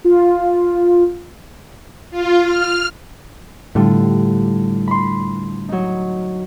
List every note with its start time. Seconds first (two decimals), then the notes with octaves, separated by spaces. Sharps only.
0.05 F4
2.11 F4
2.43 F6
3.75 A2 D3 G3 F4
4.87 B5 C6
5.69 F#3 D#4